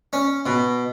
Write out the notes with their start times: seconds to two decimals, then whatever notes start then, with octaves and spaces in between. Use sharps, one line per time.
0.13 C#4
0.46 B2